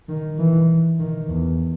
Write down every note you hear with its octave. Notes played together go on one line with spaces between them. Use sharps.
D#3
E3
D#3
E2